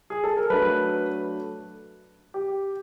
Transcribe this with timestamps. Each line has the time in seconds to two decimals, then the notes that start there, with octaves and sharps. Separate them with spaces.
0.10 G#4
0.24 A4
0.37 A#4
0.50 F#3 A3 D4 B4
2.34 G4